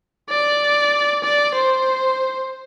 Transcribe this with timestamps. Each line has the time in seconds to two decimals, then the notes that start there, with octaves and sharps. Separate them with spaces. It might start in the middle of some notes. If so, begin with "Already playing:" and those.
0.30 D5
1.23 D5
1.54 C5